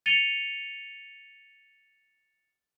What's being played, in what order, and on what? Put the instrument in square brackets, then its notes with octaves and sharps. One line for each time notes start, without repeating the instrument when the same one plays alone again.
[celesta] A6 C#7 D#7 F7 G7